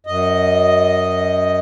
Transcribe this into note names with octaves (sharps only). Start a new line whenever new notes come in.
F#2 D#5